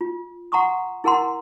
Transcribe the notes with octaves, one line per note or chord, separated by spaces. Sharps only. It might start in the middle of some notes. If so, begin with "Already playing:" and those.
F4
F#5 A#5 C6 C#6 D#6
E4 G#4 A#4 F#5 A#5 C6